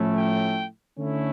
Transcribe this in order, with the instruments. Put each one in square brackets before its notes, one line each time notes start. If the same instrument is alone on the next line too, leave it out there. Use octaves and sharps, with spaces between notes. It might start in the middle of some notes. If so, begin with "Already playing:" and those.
Already playing: [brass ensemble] A2 F3 A3 C#4 E4
G5
D3 A3 C#4 E4